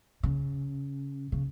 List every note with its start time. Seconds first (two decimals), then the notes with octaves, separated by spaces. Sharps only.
0.23 C#3
1.32 C#3